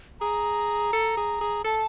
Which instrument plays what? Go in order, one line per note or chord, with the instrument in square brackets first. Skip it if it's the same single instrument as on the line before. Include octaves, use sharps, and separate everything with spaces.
[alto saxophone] G#4 [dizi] A#5
[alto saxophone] A4
G#4
G#4
[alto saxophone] A4 [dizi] A5